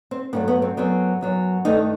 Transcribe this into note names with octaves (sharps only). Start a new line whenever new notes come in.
C4
G2 F#3 A3 B3
B3
C4
F#2 F#3 B3 C4
F#2 F#3 B3
G2 D#3 A3 D#4